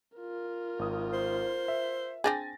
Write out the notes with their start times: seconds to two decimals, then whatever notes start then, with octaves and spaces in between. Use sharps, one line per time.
0.17 F4 A#4
0.79 G#1 D#6
1.13 C5
1.68 E5
2.24 C4 D4 G#4 G#5 A6 A#6